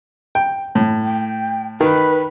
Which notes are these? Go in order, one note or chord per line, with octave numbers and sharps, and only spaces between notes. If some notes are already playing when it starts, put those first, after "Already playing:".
G5
A2
G5
D#3 B4